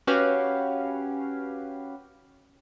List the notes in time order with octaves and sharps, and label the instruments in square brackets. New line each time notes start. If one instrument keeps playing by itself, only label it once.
[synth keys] C#4 F#4 G4 B4 F5